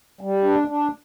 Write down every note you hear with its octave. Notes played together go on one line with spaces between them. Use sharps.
G3
D4
D4